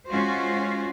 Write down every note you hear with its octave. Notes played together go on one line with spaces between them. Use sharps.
G#3 C#4 F4 F#4 C5